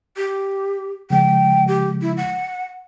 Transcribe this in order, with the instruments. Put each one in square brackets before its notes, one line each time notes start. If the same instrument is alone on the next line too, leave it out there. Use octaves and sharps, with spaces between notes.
[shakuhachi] G4
[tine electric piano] C#3 F3 G#3 [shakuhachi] G5
[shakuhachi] G4
E4
F#5